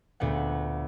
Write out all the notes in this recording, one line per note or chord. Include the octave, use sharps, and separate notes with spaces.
D2 A#2 B3 F#5